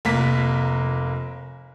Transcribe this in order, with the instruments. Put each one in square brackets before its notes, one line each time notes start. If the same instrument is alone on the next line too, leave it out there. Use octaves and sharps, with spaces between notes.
[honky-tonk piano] F1 A#3 B6